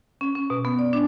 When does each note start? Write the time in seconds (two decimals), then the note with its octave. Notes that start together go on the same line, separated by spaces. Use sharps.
0.21 C#4
0.35 C#4
0.50 B2
0.65 B3
0.79 D5
0.93 D4